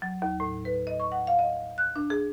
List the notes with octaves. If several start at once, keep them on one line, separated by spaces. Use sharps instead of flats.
F#3
D#2
A2
B4
D#5
C#6
F#5
F5
D#5
F#6
D4
G#4